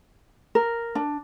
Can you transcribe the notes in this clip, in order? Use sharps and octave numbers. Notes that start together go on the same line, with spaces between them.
A#4
D4